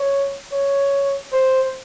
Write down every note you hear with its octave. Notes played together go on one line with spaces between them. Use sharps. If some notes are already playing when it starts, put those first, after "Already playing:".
Already playing: C#5
C#5
C5